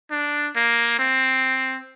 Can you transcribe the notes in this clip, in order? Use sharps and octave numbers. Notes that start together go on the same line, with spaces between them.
D4
A#3
C4